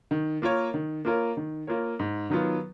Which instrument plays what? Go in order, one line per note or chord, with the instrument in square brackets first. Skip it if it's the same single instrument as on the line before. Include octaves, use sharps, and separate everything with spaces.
[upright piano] D#3
A#3 F4 A#4 C#5
D#3
A#3 F4 A#4 C#5
D#3
A#3 F4 A#4 C#5
G#2
D#3 F#3 B3 F4